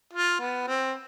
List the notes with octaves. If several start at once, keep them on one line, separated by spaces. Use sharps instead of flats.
F4
B3
C4